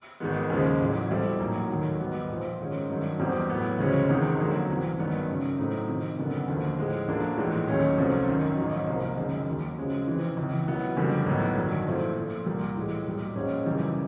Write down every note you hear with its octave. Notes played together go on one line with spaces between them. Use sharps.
G#1 G#2 D#3 G#3 B3
D#2 C#3 F3 G#3
A1 A2 F#3
B2 G3 C4 E4 A4
A#1 A2 F#3 A#3 D#4
F1 D#2 D#3 F#3
G#2 D#3 G3 B3
A#1 A#2 F3
G#2 D#3 G#3 C#4
G2 D#3 F#3
E1 E2 B2 G3 C4
A2 F#3 B3
D2 C#3 F3 G#3 C#4
E1 E2 C3 D#3 G#3
F2 D3 F#3 A#3
C2 C3 E3
G#1 G2 D#3 F#3 B3
G#1 F#2 C#3
A2 F#3 A3 C4 D#4
F2 C3 D#3
F#1 F#2 D3 F#3 B3
D#2 D3 F3
A2 F3 G#3
D2 D3 F3 A#3 D4
A#1 A2 E3 G#3
D#2 D#3 F#3 A3 C#4
C2 C3 F3 A3 C#4
G#1 F#2 D#3
A1 G#2 D#3 F#3
C2 C3 F3 A#3
F#1 F#2 D#3 G#3
D#2 D#3 F#3
F#2 C#3 F3 G#3
F2 C3 E3
C#2 C3 E3
B2 F#3 B3 E4
F#1 F2 D3 G3
B1 A2 F#3 B3
G1 G2 D#3 F#3
A#2 F3 A3 C4 E4
A#2 F3 A3
C2 A#2 G3 A#3
A2 E3 G#3
B1 A#2 G3
A#1 G#2 F3 G#3 C#4
G#1 F#2 C#3 E3 G3